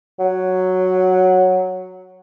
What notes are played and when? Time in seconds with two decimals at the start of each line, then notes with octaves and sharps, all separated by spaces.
0.20 F#3